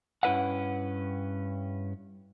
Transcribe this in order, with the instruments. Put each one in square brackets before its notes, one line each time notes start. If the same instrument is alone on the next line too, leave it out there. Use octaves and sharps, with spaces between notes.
[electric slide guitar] G2 C#4 E4 B4 E5 F#5